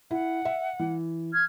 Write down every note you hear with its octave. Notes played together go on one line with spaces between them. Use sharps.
E4 F#5
E5
E3
F6 G#6